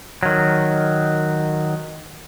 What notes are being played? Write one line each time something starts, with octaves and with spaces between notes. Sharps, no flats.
D#3 F#3